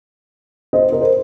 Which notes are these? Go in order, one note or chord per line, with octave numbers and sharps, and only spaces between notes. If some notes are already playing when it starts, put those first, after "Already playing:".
C5 D#5
A#4
C5